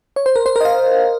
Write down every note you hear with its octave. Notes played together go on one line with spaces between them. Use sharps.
C#5
C5
A#4
C5
A#4 D#5
F5